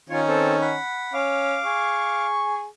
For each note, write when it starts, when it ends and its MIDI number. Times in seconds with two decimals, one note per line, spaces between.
0.10 0.76 51
0.10 0.76 61
0.10 0.76 63
0.10 0.20 65
0.10 0.20 73
0.27 0.56 60
0.27 0.56 69
0.61 1.13 78
0.61 1.13 83
1.14 1.59 61
1.14 2.26 77
1.14 2.26 86
1.65 2.65 68
1.65 2.65 85